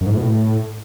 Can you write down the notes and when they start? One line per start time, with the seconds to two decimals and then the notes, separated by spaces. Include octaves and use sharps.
0.01 F#2
0.06 G#2
0.12 A2
0.17 B2
0.22 A2